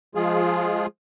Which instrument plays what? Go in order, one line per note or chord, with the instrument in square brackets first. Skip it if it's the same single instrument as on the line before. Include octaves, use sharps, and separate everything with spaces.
[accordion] F3 G#3 F4 G#4